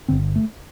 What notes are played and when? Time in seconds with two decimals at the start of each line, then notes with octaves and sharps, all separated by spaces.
0.08 G1 G2 D3 C4
0.36 A3